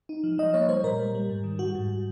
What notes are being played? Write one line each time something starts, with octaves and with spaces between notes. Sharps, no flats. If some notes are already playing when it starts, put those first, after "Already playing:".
D#4
F3
F3 D#5
A#3 C#5
G3 C5
A#2 A#4
G3
G3
G#2
D#3
G3 F#4
G#2